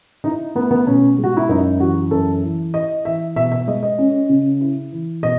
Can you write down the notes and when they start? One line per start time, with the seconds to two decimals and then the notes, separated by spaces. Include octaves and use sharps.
0.24 D#4 E4
0.55 A3 B3
0.71 B3
0.87 B2 C#4
1.18 G#3
1.24 F#4
1.37 E4
1.49 F#2 D#4
1.80 E3 F#4
2.11 F#2 A4
2.43 E3
2.74 E4 D#5
3.05 E3 E5
3.36 B2 E5
3.52 E5
3.68 G#3 D#5
3.83 D#5
3.98 C#4
4.29 C#3
4.61 E4
4.92 E3
5.23 B2 D#5